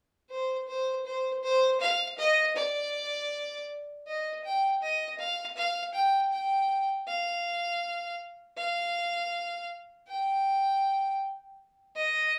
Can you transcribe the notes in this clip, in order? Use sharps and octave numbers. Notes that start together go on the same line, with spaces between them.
C5
C5
C5
C5
F5
D#5
D5
D#5
G5
D#5
F5
F5
G5
G5
F5
F5
G5
D#5